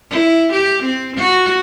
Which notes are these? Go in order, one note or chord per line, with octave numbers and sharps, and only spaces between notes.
E4
G4
C4
F#4